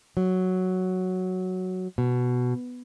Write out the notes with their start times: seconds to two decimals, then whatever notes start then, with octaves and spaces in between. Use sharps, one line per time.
0.17 F#3
1.98 B2